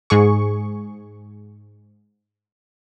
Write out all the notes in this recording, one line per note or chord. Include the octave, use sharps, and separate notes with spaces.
G#2 G#4 C#6